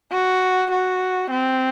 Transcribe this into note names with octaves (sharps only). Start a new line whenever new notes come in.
F#4
F#4
C4